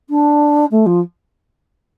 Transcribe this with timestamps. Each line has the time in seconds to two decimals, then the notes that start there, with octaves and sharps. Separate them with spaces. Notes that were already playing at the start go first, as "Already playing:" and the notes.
0.09 D4
0.71 A3
0.86 F3